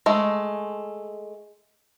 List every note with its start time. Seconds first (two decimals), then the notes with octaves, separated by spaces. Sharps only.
0.06 G#3 A3